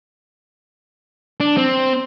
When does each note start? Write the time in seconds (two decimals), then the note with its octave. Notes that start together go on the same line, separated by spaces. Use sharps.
1.40 D4
1.57 C4